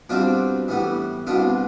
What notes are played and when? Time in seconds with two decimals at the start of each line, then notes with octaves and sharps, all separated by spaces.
0.09 B2 G3 C4 D4 F4
0.68 A2 E3 G3 B3
1.27 C2 B2 B3 D4 F4